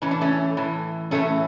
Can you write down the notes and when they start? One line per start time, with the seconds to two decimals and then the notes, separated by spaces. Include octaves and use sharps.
0.02 A2 E3 C#4
0.11 D4
0.21 A3 C#4
0.57 A2 E3
1.11 A2 E3 A3 C#4